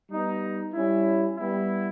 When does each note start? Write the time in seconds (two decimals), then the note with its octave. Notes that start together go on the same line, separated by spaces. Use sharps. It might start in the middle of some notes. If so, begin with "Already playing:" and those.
0.10 G3 B3 D#4
0.74 G3 C#4 E4
1.37 G3 B3 E4